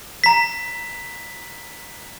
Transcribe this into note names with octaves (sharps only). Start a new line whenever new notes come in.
A#5 B6